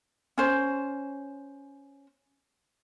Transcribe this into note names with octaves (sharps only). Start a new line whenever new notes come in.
C#4 C5